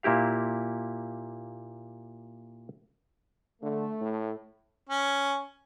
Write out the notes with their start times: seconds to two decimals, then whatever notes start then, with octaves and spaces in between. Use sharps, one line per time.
0.03 A#2 A#3 E4 G4 F5
3.62 D3 A3
4.01 A2
4.89 C#4